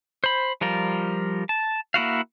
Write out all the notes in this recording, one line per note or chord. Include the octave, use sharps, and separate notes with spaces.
C5 B5
F3 G3 F4 A#4
A5
A#3 E4 F#4 F5